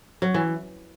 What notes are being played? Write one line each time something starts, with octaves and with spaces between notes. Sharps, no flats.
F#3
E3